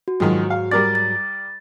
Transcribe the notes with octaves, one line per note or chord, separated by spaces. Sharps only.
F#4
G#2 D#3 F3 F#3 G#3
F5
G3 A#4 D5 A6
A6